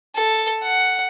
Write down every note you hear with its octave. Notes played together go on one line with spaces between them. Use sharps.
A4
F#5